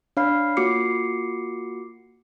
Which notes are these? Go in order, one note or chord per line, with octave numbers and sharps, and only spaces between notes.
D4 C#5 F5 B5 F6 C7
A#3 F4 F#4 D6 C7 C#7